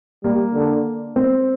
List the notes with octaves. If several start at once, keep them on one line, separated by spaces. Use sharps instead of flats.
G3 A#3
D3
C4